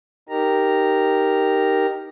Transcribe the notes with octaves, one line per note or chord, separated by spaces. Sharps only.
D#4 G4 A#4 A#5